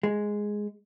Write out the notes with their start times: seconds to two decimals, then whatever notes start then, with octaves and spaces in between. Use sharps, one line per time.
0.03 G#3